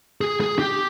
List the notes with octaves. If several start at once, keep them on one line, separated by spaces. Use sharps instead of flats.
G#4
G#4
G4